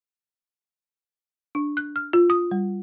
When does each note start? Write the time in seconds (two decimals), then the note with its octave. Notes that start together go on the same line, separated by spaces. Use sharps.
1.55 D4
1.77 F#6
1.96 F6
2.13 F4
2.30 D#6
2.51 G3